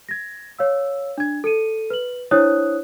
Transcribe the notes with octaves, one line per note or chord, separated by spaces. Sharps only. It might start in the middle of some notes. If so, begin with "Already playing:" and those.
G#6 A#6
C#5 F5 E6
D4 G#6
A4 C#7 D#7
B4 F#7
D4 E4 C5 C#5 D#6 F#6